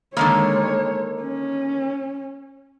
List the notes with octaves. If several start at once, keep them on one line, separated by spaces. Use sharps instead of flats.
D3 D#3 G#3 A#3 C#5
C#4